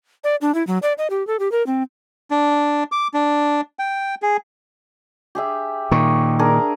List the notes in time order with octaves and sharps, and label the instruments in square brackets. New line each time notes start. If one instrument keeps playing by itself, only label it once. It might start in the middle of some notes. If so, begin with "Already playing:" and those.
[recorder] D5
D4
E4
F#3
D5
D#5
G4
A4
G4
A#4
C4
[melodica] D4
D6
D4
G5
G#4
[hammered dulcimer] G4 G#4 E5
[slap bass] A#2 D#3 [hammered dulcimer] C#6
[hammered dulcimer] D4 G#4 A#4